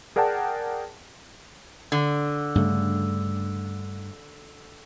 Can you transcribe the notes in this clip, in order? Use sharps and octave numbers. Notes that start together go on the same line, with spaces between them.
G#4 A#4 D5 F#5 G5 A5
D3
G2 C#3 A3